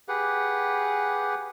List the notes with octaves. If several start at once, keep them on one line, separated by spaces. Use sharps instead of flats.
G4 G#4 B4 F#5